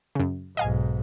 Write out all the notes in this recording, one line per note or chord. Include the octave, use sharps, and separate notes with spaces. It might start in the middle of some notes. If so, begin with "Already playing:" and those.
F#2 C#3
B1 G#2 D#5 F5 G#5